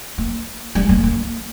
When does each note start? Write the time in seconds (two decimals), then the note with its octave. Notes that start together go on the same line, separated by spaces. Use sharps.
0.18 A#3
0.75 G3
0.89 A#3
1.04 A#3